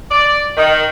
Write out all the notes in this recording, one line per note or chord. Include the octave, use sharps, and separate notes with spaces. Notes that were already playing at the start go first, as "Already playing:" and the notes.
D5
D#3